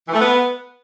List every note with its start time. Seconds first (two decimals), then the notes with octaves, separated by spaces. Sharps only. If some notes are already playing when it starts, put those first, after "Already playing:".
0.07 E3
0.13 A3
0.20 B3